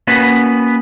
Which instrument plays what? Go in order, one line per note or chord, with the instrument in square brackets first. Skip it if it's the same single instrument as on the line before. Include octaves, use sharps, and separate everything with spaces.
[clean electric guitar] A#3 B3 C#4 F#4 B4